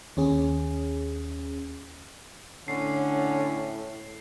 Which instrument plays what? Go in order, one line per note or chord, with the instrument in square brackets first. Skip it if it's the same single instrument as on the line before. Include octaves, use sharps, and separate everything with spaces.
[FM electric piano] D#2 C#4 G#4
[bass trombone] A2 [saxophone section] D3 [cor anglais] C#4 [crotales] C7